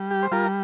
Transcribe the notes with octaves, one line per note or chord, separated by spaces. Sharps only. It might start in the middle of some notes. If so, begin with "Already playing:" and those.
Already playing: G3
G4
C5
G3 F4 A#4